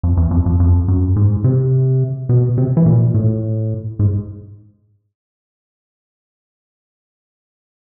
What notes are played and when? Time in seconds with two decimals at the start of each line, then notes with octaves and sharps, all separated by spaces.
0.03 F2
0.17 E2
0.31 F2
0.46 F2
0.60 F2
0.88 F#2
1.16 G#2
1.44 C3
2.29 B2
2.58 C3
2.77 E3
2.86 A#2
3.14 A2
3.99 G#2